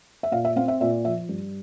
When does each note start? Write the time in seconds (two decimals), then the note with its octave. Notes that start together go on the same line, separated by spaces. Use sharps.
0.23 E5
0.32 A#2 F5
0.45 E5
0.56 C4 F5
0.68 E5
0.81 A#2 E5
1.05 F3 E5
1.29 G2